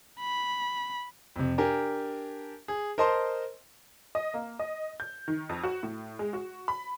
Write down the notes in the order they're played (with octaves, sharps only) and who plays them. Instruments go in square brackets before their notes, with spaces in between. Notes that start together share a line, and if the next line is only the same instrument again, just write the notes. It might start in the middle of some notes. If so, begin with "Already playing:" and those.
[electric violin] B5
[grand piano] F2 C3
D4 G4 A#4 G#5
G#4
A#4 C5 D#5 A5 C6
[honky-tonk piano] D#5
A#3
D#5
G6
D#3
F2
F#4
A2
G#3
F#4
B5